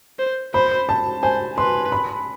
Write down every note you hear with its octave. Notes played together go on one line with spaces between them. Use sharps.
C5
C5 B5
A5
C5 G#5
B4 C6
B5